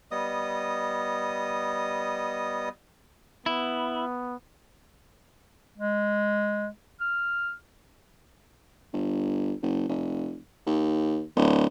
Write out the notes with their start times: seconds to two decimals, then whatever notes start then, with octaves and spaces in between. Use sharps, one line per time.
0.11 G3 B3 D#5 D#6
3.46 B3 E4
5.78 G#3
7.01 F6
8.94 G1
9.62 F#1
9.89 F1
10.67 D#2
11.36 D1